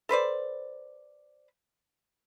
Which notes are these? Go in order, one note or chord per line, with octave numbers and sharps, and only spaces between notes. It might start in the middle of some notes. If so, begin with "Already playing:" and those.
A4 B4 C5 D5